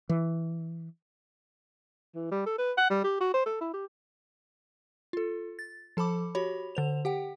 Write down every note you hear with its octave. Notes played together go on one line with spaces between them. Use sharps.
E3
E3
G3
A4
B4
F#5
G3
G4
F#4
C5
A4
E4
G4
F4 A4
A6
F3 A4 A5 B5 D6
F#4 G4 C#5 B5
D3 C5 F7
G4 F#5 G5